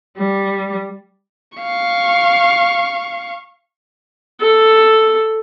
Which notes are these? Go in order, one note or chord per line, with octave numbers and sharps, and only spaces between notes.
G3
F5 C#6
A4